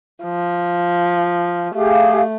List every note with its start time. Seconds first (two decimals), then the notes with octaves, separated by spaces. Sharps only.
0.24 F3
1.75 A3 G4 G#4 F5